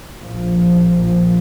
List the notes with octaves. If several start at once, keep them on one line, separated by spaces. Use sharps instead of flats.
A#1 A#2 F3